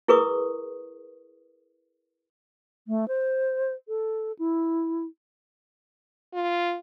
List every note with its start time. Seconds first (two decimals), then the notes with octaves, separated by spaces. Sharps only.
0.08 E4 G#4 A#4 B4 C#6 D#6
2.88 A3
3.08 C5
3.88 A4
4.39 E4
6.34 F4